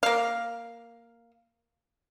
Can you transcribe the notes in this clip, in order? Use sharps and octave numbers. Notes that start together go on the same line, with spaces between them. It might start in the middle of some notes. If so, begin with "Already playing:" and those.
A#3 F5